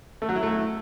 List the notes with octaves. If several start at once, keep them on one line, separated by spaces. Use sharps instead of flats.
A3
F#3
E4
A3